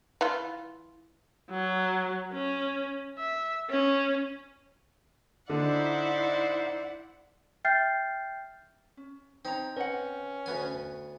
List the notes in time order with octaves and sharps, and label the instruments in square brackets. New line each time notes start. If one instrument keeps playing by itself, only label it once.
[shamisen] E3 F4
[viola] F#3
C#4
E5
C#4
[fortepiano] D3 [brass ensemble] D#4 C5 E5 [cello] E4 F#5 [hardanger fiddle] D5
[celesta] E5 G5 F6 G6 A6 C7
[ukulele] C#4
[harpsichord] C4 [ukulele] D#4 C#5 A#5
[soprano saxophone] C#4 [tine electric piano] B4 [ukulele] D#5 F#5
[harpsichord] D2 B3 G#5